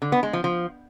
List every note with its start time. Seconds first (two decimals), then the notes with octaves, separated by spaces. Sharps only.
0.02 D3
0.12 B3
0.23 G#3
0.33 F3
0.44 F3